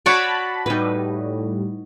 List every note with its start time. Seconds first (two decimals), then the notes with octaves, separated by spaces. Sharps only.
0.06 F#4 C#5 D5 A5 B5
0.66 A2 G3 D#4 B4